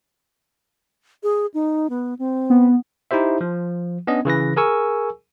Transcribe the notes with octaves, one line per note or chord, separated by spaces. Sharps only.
G#4
D#4
B3
C4
B3
D#4 E4 G4 C5 E5
F3
B3 C#4 D4 D#5
C#3 E3 B4 A#6
G#4 A#4 G#5 C#6 E6